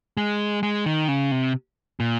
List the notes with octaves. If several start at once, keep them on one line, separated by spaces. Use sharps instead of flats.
G#3
G#3
D#3
C#3
C3
A#2